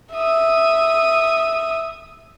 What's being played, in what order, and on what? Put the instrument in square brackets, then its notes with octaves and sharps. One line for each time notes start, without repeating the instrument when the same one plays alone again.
[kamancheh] E5 D#6